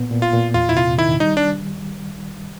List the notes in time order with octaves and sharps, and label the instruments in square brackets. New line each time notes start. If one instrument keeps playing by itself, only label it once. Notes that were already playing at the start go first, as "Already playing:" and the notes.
Already playing: [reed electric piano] A#2 B3
A#2
[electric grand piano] F4
[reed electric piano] A#2
[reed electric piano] E2 [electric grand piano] F4
[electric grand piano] E4
[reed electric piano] C3 [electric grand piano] F4
[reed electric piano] D#3 [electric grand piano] E4
[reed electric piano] G3 [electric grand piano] D#4
[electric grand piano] D4